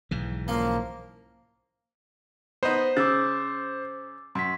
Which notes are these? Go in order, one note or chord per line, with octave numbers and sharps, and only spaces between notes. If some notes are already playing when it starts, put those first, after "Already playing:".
B1 G#2 E3
F3 A#3 C#4 F5
B3 D#4 C5
C#3 D6 E6 A6
F#2 C6 B6